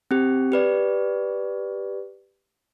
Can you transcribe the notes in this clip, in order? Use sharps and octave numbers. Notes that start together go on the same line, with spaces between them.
C4 G4
G4 B4 D5